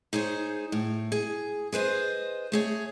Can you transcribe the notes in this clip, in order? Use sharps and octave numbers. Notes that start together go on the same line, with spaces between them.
D#4 G#4 C5 C#5
A2
G#4
G#4 B4 C5 D#5
A3 G#4 C#5